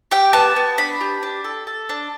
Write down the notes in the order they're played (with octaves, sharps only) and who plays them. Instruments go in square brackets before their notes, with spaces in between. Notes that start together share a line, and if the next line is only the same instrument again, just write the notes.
[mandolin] G4 G5
B3 A5
B3
D4 B5
G4
D4
A4
A4
D4